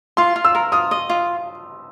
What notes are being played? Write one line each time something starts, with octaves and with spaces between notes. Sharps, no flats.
F4 C6
F4
E6
A#4
F4 D#6
D#5
F4